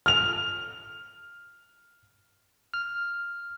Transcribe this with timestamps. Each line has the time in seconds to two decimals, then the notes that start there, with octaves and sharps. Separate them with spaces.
0.06 F6 F7
2.74 F6